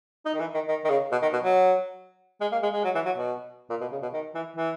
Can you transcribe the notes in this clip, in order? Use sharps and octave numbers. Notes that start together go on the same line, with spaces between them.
D#4
D#3
E3
D#3
D#3
D#3
C#3
B2
D#3
B2
F#3
G#3
A#3
G#3
G#3
F#3
E3
F#3
B2
A#2
B2
C#3
B2
D#3
E3
E3